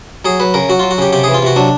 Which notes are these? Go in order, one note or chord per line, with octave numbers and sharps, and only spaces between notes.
F#3 G#4
F#3 B4
C#3 A#4
F#3 F#4
F#3 F4
F#4
C#3 G4
C3 G4
E3 G#4
F4
C3 F#4
F#3 D4